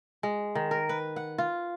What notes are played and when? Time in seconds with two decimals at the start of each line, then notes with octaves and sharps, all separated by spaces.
0.23 G#3
0.55 D#3
0.71 A#4
0.89 B4
1.16 F#5
1.38 F4